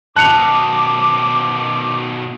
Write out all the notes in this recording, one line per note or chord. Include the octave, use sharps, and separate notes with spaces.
B2 D#3 A5 D6 F#6 C#7 F7